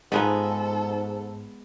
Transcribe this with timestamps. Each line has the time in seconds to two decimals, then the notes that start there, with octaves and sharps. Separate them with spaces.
0.12 G#2 F3 G#3 B3 D#4 G#4 A4 B4